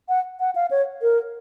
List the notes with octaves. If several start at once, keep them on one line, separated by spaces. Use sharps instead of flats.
F#5
F#5
F5
C#5
A#4